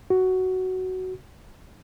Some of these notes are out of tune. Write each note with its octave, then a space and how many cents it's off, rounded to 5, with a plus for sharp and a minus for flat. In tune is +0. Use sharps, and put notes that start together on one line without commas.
F#4 +10